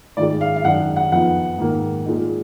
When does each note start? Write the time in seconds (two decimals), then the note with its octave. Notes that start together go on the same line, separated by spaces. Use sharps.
0.17 G#2 D#3 G#3 D5
0.41 F5
0.56 F5
0.65 F#2 D#3 G#3 D4 F#5
0.96 F#5
1.12 F2 F3 B3 D#4 F#5
1.58 G#2 D#3 A#3
2.06 A#2 G#3 D#4